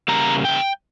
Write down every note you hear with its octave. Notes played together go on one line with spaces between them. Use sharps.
E2 C#3 G3 A#3 A#5
G5